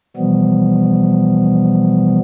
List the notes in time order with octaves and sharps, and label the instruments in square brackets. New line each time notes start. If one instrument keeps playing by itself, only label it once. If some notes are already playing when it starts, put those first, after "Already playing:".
[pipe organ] B2 E3 F3 G3 B3